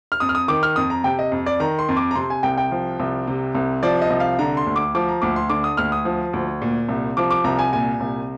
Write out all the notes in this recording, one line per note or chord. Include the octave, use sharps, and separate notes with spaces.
F6
F2 D#6
F6
D#6
D#3 D6
F6
F2 D#6
A#5
C3 G5
D#5
F2
D5
D#3 A#5
C6
F2
D6
A#5
C3 C6
G#5
C2 G5
G5
F3
C2
C3
C2
F3 D5
D#5
C2
F5
D3 A#5
C6
D2
D6
F3 D6
A#5
D2 D6
C6
D3 D6
D#6
D2 F6
D#6
F3
D2
A#2
C2
F3 D6
D6
C2 A#5
G#5
A#2 G#5
C2